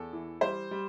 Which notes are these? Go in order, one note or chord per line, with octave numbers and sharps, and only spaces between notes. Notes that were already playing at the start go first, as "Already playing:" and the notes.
Already playing: E2 A4
E3
G3 C5
G3